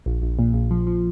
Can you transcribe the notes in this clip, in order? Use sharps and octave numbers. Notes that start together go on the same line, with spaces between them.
A#1
A#1
A#2
A#1
F3
F3